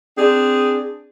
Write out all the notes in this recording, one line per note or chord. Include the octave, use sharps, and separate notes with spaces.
C4 D4 G#4